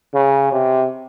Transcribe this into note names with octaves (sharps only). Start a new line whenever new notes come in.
C#3
C3